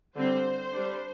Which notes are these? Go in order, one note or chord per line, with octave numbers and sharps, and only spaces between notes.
D3 G3 C4 C5
G3 D4